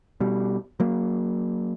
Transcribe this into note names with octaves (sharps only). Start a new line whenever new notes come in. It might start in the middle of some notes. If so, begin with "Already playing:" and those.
B2 G3
F#3 A#3